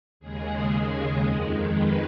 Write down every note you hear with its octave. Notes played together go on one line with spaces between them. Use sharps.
D#2 C#3 G#3 G#4
G#4
F2 D#3 G#3
B4